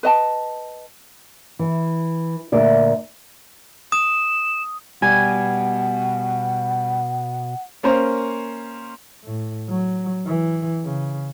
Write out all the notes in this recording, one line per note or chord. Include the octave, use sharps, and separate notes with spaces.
B4 D#5 A5
E3
D2 A#2 D5 E5
D#6 E7
B2 G3 F#5 G#5 G#6
A#3 C#4 A#4 C5
A2
F#3
E3
C#3